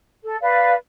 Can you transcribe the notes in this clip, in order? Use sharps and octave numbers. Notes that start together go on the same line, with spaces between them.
A4
B4 D5 F5